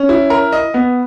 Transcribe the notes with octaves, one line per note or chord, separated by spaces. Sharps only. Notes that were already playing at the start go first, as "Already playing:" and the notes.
Already playing: C#4
E4
A#4
D#5
B3